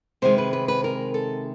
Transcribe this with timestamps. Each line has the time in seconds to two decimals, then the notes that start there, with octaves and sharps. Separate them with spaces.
0.22 C3 D#3 G#3 C5
0.38 B4
0.53 B4
0.68 B4
0.84 A#4
1.14 A4